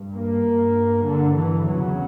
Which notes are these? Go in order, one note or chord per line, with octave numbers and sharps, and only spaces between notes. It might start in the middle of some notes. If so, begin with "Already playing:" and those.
Already playing: G2
A#3
G2
G2 D3
E3
E2 C#3 F#3